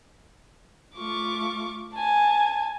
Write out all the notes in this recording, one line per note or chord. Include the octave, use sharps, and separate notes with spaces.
A3 F4 C#6 D6
G#5 A5